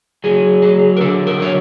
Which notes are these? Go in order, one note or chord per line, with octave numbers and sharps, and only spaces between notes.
F#3 G#4
F#3
A#4
D3 A4
A#4
F#3 C#5